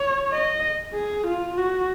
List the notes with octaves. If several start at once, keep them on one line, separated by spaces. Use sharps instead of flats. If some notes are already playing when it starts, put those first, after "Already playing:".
Already playing: C#5
D#5
G#4
F4
F#4